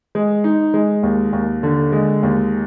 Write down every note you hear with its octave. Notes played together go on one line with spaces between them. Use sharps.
G#3
D#4
G#3
D#2
D#2
D3
G#3
D#2